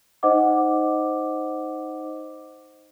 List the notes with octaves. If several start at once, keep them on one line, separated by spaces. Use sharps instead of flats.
D#4 C5 D#5 F#5 D6